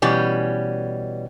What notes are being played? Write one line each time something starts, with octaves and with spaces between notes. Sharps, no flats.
B2 E3 G3 C#4